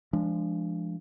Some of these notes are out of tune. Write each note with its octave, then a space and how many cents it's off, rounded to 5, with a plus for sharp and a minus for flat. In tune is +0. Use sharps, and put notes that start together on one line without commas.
F3 -25 G#3 +0 D4 +0